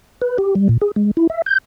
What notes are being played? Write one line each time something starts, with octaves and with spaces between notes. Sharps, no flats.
B4
G4
G3
A#2
G#4
G#3
E4
E5
G6